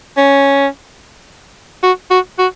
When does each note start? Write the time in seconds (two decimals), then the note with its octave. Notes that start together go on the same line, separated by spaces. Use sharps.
0.17 C#4
1.83 F#4
2.11 F#4
2.38 F#4